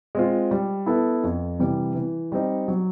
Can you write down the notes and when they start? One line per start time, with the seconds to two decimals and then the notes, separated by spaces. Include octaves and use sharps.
0.15 G#3 C4 F4
0.51 G3
0.86 B3 E4 A4
1.24 F2
1.59 C3 E3 G3
1.95 E3
2.32 G3 C4 D#4
2.68 F#3